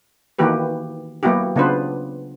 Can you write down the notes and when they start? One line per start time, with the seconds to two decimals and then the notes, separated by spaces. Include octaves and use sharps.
0.39 D#3 E3 A#3 F#4 G4 B4
1.23 F#3 A#3 B3 E4 F#4 G4
1.56 C#3 B3 D4 F4 B4 C5